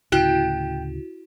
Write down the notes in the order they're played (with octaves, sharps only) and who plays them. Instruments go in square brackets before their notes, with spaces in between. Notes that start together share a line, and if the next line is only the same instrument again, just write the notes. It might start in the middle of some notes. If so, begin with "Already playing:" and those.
[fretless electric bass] D2 A2 C#3 [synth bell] E4 F#4 [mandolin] G5 F#6